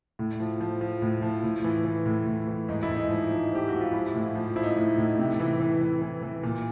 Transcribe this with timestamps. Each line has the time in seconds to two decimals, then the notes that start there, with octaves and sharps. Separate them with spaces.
0.19 A2
0.40 F3
0.61 F3
0.81 F3
1.02 A2
1.22 F3
1.43 A2
1.64 E3
1.85 E3
2.06 A2
2.27 A2
2.48 E3
2.68 G#2 D#4
2.83 E4
2.90 G#2
2.96 D#4
3.10 F3
3.31 F3
3.52 F3 G4
3.68 G#2 F#4
3.81 F4
3.93 F3 E4
4.14 A2
4.35 F3
4.56 F3 E4
4.63 D#4
4.70 E4
4.77 A2
4.98 A2
5.19 C3
5.39 E3
5.60 E3
5.81 E3
6.02 E3
6.23 E3
6.43 A#2